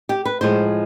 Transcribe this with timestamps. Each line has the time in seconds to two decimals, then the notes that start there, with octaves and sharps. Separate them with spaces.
0.09 G4
0.25 B4
0.41 A2 F3 G#3 C5